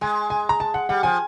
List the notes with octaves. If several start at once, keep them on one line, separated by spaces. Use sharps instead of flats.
G#3 G#5
G#5
A#5
A5
F#5
G3 F#5
F3 G#5